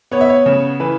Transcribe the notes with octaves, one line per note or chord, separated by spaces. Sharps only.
B3 C#5
E5
C#5
C#3
E3 B4